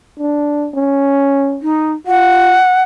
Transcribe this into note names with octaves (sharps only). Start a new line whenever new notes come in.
D4
C#4
D#4
F4 F#5